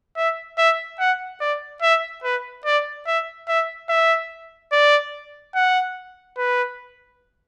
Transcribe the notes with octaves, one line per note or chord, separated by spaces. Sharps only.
E5
E5
F#5
D5
E5
B4
D5
E5
E5
E5
D5
F#5
B4